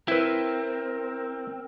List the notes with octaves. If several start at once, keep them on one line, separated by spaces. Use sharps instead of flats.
C4 E4 A#4 B4